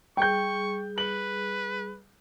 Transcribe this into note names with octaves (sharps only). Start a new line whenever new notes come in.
G3 G#4 G5 C#6 G6
B4 F#7